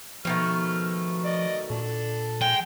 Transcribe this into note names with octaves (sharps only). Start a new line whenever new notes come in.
B2 D#3 F3 A3 F6
D5 D#5
A#2 D4 A4
G#3 G5